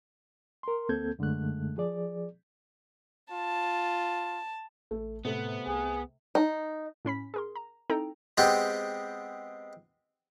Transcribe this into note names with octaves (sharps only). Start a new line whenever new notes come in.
A#4 C6
D2 A#3 C4 A4 G6 G#6
F#2 D3 G#3 A3 F#6
F3 G#4 D5
F4 A5
A1 A3
A2 C3 A3 B3
C2 G#4
D#4
A2 C#4 B5 B6
G#4 A#4 C6
A#5
C4 D#4 E4 A4 G5 A#5
G#3 B3 C4 G4